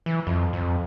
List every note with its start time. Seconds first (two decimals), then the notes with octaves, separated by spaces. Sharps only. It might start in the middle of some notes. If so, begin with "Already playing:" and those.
0.06 E3
0.27 F2
0.53 F2